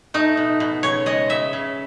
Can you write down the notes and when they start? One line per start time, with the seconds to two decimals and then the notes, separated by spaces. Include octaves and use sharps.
0.14 A3 D#4
0.37 B2
0.60 B2
0.83 C#3 C#5
1.06 G#3 D#5
1.29 C#3 E5
1.53 C#3